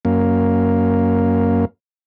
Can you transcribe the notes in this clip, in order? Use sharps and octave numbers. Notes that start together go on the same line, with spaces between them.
F#2 A#3